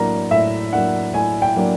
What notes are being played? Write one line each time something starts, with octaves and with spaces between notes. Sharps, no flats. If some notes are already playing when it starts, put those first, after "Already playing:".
Already playing: A2 F#3 A#3 D4 A#5
A2 E5
F#3 A#3 D4 F#5
A2 G#5
G5
F#3 A#3 D4